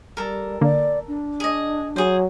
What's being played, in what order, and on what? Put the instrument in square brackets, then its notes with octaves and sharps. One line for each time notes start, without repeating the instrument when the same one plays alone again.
[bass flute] G3 [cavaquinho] A4 A#4
[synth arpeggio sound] D3 A#3 [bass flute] D5
[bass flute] D4
[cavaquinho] G#4 D#5
[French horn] F#3 [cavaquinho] G#4 C5